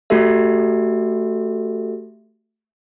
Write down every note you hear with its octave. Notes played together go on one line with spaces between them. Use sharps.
A3 F#4 G4 A4 E5